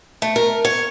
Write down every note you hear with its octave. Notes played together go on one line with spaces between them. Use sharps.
A3
A#4
C#5